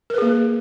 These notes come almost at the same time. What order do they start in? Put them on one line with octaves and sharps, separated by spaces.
A#4 B4 G#4 A#3